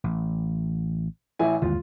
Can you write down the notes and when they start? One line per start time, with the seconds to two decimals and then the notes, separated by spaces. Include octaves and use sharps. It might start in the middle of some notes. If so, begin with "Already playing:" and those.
0.04 A1
1.39 A1 E4 G#5
1.62 G1 D#2 G#3 F4